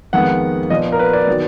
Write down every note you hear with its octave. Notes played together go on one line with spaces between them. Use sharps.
F2 D#3 G#3 B3 F#5
A#2 F3 B3 D#5
A#4
B4
D5
D#3 F#3 B3